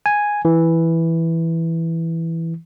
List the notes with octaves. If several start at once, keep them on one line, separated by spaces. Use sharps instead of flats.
G#5
E3